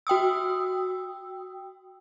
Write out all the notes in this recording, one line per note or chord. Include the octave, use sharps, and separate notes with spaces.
F#4 G5 D#6 E6